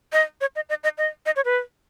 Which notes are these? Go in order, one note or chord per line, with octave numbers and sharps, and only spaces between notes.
D#5
C#5
D#5
D#5
D#5
D#5
D#5
C#5
B4